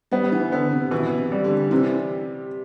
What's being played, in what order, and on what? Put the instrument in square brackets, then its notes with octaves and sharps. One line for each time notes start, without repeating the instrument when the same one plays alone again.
[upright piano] G3 [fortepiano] B3
[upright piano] E3
[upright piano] D3 [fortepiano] B3
[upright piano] C3
[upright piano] B2 [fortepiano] E3
[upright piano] C3
[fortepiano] G3
[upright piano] D3
[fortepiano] C3 [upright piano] E3